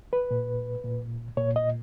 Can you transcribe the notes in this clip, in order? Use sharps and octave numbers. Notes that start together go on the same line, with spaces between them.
B4
A#2
A#2
A#2 C#5
D#5